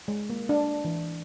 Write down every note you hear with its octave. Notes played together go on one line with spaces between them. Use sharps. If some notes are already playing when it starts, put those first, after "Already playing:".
G#3
A#3
D4
E3